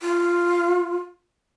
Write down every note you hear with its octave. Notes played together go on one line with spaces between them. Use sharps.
F4